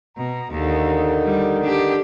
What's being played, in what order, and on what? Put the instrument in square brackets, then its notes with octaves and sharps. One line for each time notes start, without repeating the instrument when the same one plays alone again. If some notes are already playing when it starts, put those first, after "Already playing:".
[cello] B2 [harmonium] A#5
[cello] D#2 [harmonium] D3 D#3 D#4
[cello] G3
D4 G4